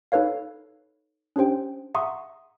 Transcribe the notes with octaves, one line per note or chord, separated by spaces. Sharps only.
D#4 A4 B4 C#5 F5
C#4 D4 G4 C5 G5
E5 F#5 A#5 C6 C#6 D#6